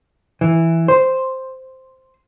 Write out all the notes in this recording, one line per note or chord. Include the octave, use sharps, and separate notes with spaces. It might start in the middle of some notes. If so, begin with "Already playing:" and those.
E3
C5